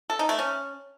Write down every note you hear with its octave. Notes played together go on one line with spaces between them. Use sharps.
A4
D#4
A3
C#4